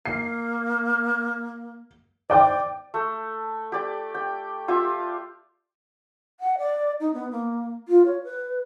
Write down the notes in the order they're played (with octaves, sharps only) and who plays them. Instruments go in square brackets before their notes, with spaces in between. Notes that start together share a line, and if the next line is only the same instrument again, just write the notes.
[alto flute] A#3 [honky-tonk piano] C7
[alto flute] C5 [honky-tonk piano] D5 G5 D6
[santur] A3
G4 D5
G5
F4 G4 E5
[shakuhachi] F#5
D5
D#4
B3
A#3
F4
C#5
B4